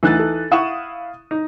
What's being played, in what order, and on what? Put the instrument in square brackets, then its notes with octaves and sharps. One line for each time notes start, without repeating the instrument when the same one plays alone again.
[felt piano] D2 F#6 A6 [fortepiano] E3 D#4
[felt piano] A4
[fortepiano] E4 F#5 C#6 [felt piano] F5 D#6 E7
[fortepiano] D#4